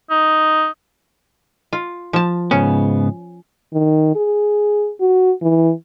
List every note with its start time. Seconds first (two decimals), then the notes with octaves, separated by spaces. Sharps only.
0.10 D#4
1.73 F4
2.13 F3 A5
2.51 G#2 C#3 B3 C#4
3.73 D#3
4.16 G#4
5.00 F#4
5.42 E3